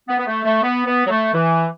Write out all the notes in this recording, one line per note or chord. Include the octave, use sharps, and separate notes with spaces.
B3
B3
A3
A3
B3
B3
F#3
A3
E3